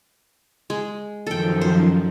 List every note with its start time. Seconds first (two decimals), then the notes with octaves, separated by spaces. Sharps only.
0.70 G#3
1.27 F#2 D#3 F3 A4 G5
1.61 C5